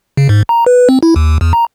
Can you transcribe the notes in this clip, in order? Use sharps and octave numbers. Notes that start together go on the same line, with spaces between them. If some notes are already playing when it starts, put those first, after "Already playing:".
C#3
G#2
A#5
B4
C4
E4
D#2
E2
A#5